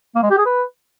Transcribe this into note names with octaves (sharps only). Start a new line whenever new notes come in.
A#3
G#3
G4
G#4
B4